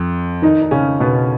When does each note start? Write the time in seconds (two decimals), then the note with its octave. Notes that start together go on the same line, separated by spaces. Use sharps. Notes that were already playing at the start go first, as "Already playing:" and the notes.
Already playing: F2
0.42 D#3 D#4
0.62 D#4
0.71 C#3 C#4
1.00 B2 B3